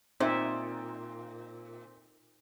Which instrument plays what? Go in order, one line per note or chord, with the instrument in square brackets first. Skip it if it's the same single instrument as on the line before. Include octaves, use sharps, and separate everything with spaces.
[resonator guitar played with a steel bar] A#2 [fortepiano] C4 [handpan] D#4 E5